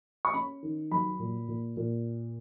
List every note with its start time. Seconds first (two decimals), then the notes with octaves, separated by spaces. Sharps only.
0.25 C#6
0.34 C#4 B5
0.63 D#3
0.91 F#2 B5
1.19 A#2
1.48 A#2
1.77 A#2